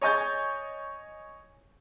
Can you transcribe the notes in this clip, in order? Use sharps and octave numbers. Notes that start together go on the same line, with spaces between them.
C#5 D#5 G#5 C#6 G6 A6